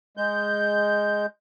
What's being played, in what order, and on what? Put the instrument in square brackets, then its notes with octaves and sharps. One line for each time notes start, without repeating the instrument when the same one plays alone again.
[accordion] G#3 G6